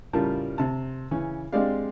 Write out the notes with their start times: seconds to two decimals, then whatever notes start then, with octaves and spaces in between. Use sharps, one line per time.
0.13 A2 C#3 G3 F4 A#4 A5
0.58 C3 A5
1.11 C#3 E3 C#4
1.53 G#3 C4 D4 G4 D5 F5